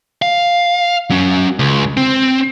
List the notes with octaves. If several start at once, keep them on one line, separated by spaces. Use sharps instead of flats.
F5
F#3 C#4
C#2
C4